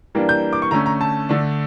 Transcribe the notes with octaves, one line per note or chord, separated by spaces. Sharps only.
E3 G3 A#3 D4
G6
D6
C#6
D3 A3 C#4 A#5
A#5
A5
D3 A3 D4